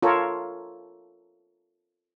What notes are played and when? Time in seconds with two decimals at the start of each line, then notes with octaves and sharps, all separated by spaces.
0.02 F4 A4 A#4 C#5